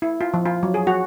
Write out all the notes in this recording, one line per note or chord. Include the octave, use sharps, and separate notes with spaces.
E4
F4
F3
F4
F#3
G#4
F#4